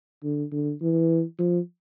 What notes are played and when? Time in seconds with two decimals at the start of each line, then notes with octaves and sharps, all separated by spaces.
0.24 D3
0.52 D3
0.82 E3
1.39 F3